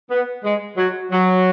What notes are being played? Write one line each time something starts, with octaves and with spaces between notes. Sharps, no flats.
B3
G#3
F#3
F#3